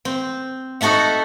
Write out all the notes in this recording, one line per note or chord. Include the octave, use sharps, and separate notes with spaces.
C4
D#4 F#4 A4 E5 F#5